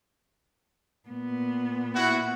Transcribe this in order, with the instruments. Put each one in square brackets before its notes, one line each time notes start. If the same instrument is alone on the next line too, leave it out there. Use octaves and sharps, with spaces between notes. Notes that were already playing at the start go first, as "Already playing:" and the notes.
[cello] A#2 B3
[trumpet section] E4 F#4